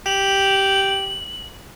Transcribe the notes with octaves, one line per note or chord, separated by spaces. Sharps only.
G4 F#7